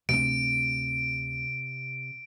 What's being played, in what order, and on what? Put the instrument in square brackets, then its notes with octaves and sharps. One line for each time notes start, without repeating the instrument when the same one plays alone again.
[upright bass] D2 C4 [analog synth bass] C3 [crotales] D7